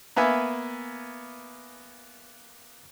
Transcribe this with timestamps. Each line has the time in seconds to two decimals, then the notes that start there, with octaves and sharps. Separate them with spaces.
0.16 A#3 B3 B4 E5 G#5